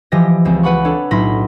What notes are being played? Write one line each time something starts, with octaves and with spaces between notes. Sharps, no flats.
E3 F3 G4 D#5 A#6
C#2 C4
B4 F#5 B5 C#6
D4 A4 C#5
B1 A2 B5 C6 A#6 B6